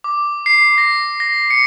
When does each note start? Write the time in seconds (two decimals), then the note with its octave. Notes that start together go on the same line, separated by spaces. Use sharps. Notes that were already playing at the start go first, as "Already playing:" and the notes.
0.04 D6
0.46 C7
0.78 A#6
1.20 A#6
1.50 C#7